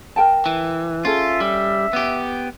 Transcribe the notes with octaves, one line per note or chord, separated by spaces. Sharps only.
A#4 G5 A5
E3
C#4 F4 G#4 A4 E5
G3
B3 G4